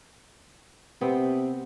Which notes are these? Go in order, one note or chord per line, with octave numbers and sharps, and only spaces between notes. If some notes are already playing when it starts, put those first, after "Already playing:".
C3 B3 C4